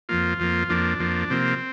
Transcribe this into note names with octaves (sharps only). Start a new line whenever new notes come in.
F2 F3 A#3 F4
F2 F3 A#3
F2 F3 A#3 D4
F2 F3 A#3
C3 F3 A#3 C4